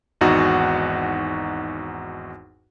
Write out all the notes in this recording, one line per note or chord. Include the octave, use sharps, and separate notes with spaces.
G#1 E2 D#4 F#4 F#5